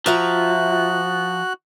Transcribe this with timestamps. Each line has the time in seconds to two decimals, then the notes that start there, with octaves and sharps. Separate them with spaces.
0.06 F3 F4 F#4 E5 A#5 F#6